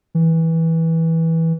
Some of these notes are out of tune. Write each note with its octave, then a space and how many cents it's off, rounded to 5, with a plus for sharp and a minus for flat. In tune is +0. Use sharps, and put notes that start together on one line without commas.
E3 -15